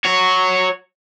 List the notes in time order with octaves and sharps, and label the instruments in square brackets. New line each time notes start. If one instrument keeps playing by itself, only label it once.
[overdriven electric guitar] F#4 C#5